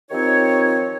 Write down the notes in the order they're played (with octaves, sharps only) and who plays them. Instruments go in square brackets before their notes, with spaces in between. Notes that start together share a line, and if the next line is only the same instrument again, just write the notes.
[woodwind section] D#3 F3 C4 D#4 G4 C#5